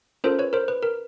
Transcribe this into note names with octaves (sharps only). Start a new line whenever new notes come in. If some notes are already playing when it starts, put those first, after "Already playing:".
C#4 F4 A4 A#4 C5
B4 C#5
A#4 C5
B4
A#4